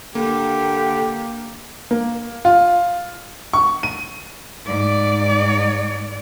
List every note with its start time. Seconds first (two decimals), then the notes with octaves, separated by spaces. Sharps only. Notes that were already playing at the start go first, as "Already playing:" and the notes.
0.15 D3 A#3 G4
1.91 A#3
2.45 F4
3.53 C#6
3.83 D#7
4.67 G#2 D5